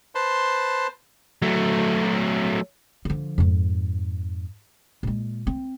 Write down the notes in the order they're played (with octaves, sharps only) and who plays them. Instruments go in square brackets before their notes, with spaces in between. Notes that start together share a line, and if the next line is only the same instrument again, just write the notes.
[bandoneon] B4 C5 A5 C6
[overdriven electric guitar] F#3 A3
[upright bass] D3 F3
F2 G#2
A#2 G#3
C4